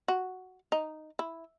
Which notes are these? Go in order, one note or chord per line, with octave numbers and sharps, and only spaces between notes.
F#4
D#4
E4